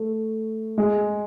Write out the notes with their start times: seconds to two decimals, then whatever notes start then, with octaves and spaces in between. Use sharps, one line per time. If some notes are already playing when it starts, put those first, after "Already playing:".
Already playing: A3
0.78 G#3